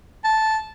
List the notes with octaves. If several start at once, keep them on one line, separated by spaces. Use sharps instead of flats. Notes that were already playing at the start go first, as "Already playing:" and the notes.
A5